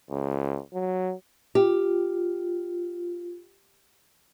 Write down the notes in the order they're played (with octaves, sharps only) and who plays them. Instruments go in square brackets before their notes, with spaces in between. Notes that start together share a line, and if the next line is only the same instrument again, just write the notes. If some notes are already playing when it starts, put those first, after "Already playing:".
[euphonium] C#2
F#3
[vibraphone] F4 [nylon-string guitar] G4